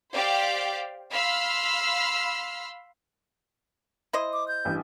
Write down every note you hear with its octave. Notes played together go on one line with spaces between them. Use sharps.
G4 C5 D5 F5 G5 D6
F5 B5 C6 E6 F6
E4 C5 D#5
D6
G6
A1 G2